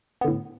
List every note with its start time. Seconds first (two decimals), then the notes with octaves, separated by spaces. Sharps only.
0.21 B3
0.25 D3
0.28 A2